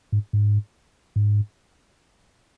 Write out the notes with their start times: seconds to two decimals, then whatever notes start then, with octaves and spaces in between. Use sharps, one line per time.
0.12 G#2
0.33 G#2
1.16 G#2